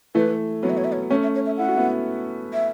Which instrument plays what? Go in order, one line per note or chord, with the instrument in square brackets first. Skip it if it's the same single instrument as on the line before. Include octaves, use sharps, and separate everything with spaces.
[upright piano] E3 A3 [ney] B4
[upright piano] F#3 B3 [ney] C#5
[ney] E5
C#5
E5
C#5
[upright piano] A3 C#4 [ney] C#5
[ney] E5
C#5
E5
[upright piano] E4 [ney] F#5
[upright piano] F#4
B3 E4
[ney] E5